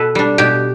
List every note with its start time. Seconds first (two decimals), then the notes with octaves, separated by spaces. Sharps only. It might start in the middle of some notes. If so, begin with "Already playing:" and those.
Already playing: B2 A4 B4
0.15 G3 D4
0.38 B2 G4